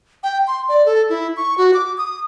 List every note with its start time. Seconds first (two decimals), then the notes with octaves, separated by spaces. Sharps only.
0.23 G5
0.47 C6
0.69 D5
0.86 A4
1.09 E4
1.37 C#6
1.58 F#4
1.74 D6
1.98 D#6